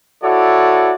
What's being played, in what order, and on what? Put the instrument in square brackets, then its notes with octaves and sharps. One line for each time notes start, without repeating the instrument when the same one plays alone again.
[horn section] E4 F#4 A4 C#5 D5